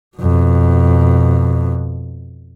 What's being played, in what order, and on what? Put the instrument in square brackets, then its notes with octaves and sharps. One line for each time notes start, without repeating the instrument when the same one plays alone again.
[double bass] F2 B2